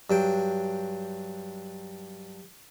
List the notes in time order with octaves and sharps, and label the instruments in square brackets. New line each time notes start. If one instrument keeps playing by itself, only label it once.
[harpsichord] G2 F#3 G5